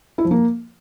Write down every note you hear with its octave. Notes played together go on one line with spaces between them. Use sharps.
E4
F3
A#3